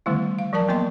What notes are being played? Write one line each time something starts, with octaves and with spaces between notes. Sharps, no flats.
D3 D#3 G3 A3 B3 E4
F5
F3 F#3 A#4 D5 A5
F3 A#3 B3 D#5 G5 C6